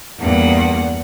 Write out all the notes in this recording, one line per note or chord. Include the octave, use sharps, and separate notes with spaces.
E2 G2 A#3 F#5